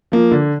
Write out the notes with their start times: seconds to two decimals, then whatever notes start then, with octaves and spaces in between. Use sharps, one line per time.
0.12 F3 A#3
0.31 D3